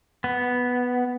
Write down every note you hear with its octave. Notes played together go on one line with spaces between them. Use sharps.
B3